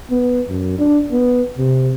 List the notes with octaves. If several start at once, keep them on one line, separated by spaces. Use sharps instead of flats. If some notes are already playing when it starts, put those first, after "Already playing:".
B3
F#2
D4
B3
C3